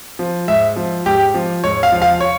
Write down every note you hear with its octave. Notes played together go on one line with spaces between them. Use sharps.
F3
G#2 E5
F3
G#2 G4
F3
G#2 C#5
F5
F3
F5
C#5